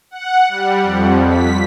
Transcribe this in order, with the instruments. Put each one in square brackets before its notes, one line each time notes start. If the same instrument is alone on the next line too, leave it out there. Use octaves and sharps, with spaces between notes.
[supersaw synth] F#5
G3
F2
B6